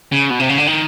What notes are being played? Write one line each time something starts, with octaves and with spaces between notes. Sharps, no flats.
C#3
B2
C3
C#3
D3
D#3